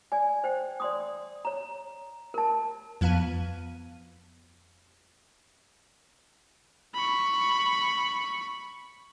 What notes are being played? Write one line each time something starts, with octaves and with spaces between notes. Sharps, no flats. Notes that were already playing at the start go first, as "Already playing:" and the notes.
D5 G#5
C5 G5
D5 C6 D#6
C#5 A#5
A#4 A5
F2 F3 B3 F5 A5 D#7
B5 C#6